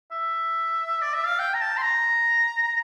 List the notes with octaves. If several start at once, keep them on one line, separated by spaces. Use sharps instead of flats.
E5
D5
E5
F5
G5
A#5
A5
C6
A#5